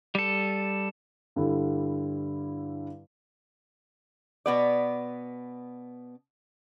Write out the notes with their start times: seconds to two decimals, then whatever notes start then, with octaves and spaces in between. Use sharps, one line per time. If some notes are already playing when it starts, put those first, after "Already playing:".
0.15 G3 A4
1.36 G2 D3 G3 E4
4.46 B2 B3 D5